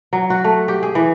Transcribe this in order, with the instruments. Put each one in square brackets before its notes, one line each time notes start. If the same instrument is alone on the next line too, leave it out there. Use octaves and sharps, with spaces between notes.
[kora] F#3
F#4
A3
G4
G#4
E3